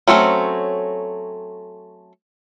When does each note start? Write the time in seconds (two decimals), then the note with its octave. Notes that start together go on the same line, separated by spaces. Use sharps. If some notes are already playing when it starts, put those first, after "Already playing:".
0.08 F#3 A3 C4 C#4